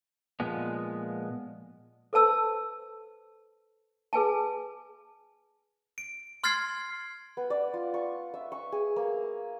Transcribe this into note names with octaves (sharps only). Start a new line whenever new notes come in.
A#2 F3 G#3 B3
A4 B4 C5 A5 E6
G#4 B4 G#5 A5
D7
C6 F6 G#6 A6 C7
B3
D5
F4
C#6
E5
C#6
G#4
A#3